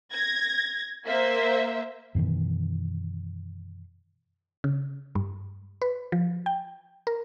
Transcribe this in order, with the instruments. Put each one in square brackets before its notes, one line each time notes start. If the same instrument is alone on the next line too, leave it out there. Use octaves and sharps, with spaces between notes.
[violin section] G#6 A#6
A#3 C5 E5
[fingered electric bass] F#2 B2 D#3 E3
[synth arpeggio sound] C#3
G2
B4
F3
G5
A#4